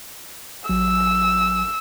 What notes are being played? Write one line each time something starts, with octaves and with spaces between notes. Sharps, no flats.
A1 F#3 E6